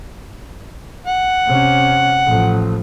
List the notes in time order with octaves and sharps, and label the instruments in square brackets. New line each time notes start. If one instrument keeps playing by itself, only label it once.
[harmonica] F#5
[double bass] C3 C#4
A1 F3